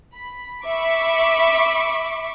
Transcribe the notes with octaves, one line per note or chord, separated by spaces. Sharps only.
B5
E5 B5 C#6 D6